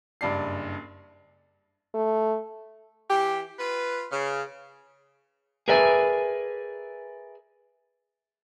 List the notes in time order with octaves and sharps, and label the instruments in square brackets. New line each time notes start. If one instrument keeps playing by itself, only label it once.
[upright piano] F#1 G2 D5 C7
[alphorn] A3
[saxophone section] E3 G4
F4 B4
C#3
[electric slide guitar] G#4 A#4 B4 D5 E5 G#5